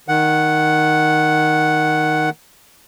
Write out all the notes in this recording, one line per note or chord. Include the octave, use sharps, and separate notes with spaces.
D#3 F#5